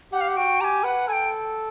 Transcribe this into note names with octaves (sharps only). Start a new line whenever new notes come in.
G4 F#5
F5
F#5
F#4 G5
G4 G#5 A#5
B4 F#5
A4 G5 G#5